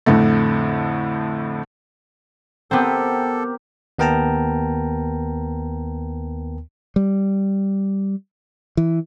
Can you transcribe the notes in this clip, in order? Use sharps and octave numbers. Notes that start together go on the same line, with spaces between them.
F2 A2 D3 A3
B3 C4 G4 A4 A#4
D#2 B3 A#4 G5 A5 A#5
G3
E3